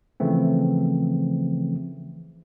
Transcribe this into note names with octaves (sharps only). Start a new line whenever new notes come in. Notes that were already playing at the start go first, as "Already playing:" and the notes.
C#3 E3 F3 A3 C4